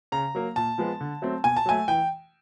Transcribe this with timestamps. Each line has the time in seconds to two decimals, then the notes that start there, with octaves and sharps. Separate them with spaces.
0.12 C#3 A#5
0.35 F#3 A#3
0.56 A#2 A5
0.78 F3 G#3 B3
1.00 D3
1.22 F#3 A3 C4
1.44 B2 G#5
1.57 A5
1.66 F#3 A3 G#5
1.88 E3 G5